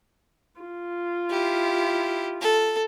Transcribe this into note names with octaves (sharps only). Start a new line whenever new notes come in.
F4
E4 G4
A4